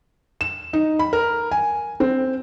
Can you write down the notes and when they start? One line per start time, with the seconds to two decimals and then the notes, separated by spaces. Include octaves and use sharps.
0.41 E7
0.73 D#4
0.99 B5
1.13 A#4
1.51 G#5
2.00 C4